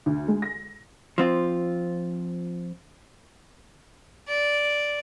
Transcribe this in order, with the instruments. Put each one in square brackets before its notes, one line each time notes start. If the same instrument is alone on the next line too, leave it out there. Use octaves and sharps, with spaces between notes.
[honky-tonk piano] D2
G#3
A#6
[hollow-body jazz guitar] F3 C4 F4
[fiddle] D5